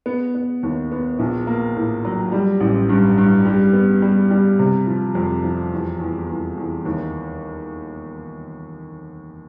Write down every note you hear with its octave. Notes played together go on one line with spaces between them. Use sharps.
B3
B3
D#2
B3
A#1
A#3
A2
F#3
G3
A1
G2
G2
G3
B3
G3
G3
C3
F3
F2
F3
E2
E2
E2
E2
D#2